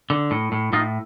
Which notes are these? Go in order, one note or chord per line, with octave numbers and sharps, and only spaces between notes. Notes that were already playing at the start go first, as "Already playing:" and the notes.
D3
A2
A2
A2 D#4 F4